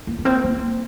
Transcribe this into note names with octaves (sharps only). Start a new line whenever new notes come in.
A#3
A#3
C4
A#3